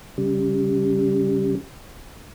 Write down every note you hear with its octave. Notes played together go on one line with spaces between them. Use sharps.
C#3 G3